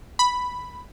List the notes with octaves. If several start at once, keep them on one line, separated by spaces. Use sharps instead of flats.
B5